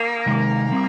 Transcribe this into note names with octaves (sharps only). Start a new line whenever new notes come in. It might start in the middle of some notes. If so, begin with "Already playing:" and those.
Already playing: A#3
C3 D#3 G#3
G3 C4